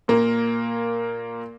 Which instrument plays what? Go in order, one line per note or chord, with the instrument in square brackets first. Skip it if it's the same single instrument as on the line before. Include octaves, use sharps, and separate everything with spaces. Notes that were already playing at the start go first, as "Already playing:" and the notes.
[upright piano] A#2 A#3 A#4